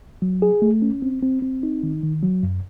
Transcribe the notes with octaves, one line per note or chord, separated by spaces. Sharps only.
F#3
G#4
A3
C#4
C4
C4
C4
D#4
D#3
D#3
F#3
F#2